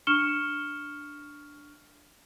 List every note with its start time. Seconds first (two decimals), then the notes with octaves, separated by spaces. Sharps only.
0.07 D4 C#6 F6 C#7 E7 G7